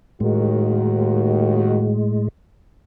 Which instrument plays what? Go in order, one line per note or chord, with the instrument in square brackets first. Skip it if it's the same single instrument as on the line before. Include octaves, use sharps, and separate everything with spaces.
[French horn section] D#2 D#3 F#4 [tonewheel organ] A2 G#3